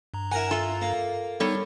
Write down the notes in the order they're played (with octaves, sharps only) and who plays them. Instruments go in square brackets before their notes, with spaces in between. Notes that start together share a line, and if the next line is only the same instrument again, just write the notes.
[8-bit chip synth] G2 A#5
[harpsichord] E4 A#4 F#5 [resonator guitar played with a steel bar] G#5
[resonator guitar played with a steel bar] F4 A4 [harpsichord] E5
[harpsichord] A#3
[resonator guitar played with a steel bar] G3 A4 C#5 [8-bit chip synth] B3 D#4